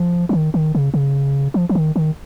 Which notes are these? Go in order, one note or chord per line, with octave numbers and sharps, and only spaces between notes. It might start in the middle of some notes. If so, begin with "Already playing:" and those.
Already playing: F3
F3
D#3
D#3
C#3
C#3
F3
F3
D#3
D#3